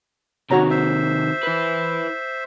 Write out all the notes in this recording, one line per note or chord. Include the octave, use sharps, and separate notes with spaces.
C3 D#3 F#4 C#5 A#5
C5 E5
E4 B4